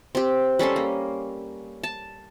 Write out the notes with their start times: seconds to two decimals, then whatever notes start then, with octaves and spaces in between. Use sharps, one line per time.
0.15 C4 G4
0.59 G3 C#4 A4 C6
0.76 A#3
1.83 A5